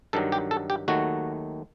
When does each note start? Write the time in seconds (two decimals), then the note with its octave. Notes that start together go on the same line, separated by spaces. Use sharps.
0.13 G2 D#3 F#3 A4
0.32 G4
0.51 A4
0.70 G4
0.88 D#2 D#3 F#3 A3 F#4